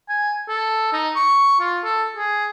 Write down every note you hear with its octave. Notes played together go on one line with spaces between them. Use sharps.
G#5
A4
D#4
C#6
F4
A4
G#4